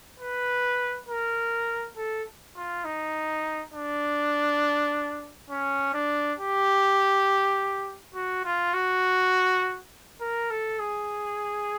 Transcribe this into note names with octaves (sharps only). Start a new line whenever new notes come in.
B4
A#4
A4
F4
D#4
D4
C#4
D4
G4
F#4
F4
F#4
A#4
A4
G#4